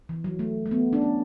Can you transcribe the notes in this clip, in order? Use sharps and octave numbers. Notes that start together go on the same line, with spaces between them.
E3
F#3
A3
A3
B3
D4
C#4